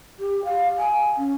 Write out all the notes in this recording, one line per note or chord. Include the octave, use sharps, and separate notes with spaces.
G4
F5
G#5
C#4